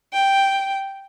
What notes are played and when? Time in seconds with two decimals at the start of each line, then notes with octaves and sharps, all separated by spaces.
0.13 G5